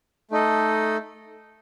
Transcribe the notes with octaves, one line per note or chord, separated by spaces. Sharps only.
A3 D#4 A4 D#5